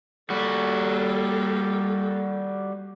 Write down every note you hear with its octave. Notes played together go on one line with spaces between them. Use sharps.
G3 A#3 F#4 A4